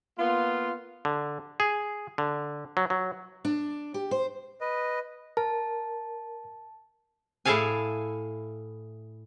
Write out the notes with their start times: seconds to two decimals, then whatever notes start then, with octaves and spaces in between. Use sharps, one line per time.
0.18 A#3 B3 F4
1.05 D3
1.60 G#4
2.18 D3
2.77 F#3
2.90 F#3
3.45 D4
3.94 G4
4.11 C5
4.61 B4 D#5
5.37 A#4 A5
7.45 A2 E4 G#4 A4 F5 G#5